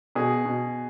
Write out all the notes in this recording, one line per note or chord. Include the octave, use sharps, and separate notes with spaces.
B2 G#4
B2